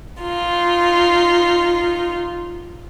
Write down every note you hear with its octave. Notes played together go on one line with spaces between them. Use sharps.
D#4 F4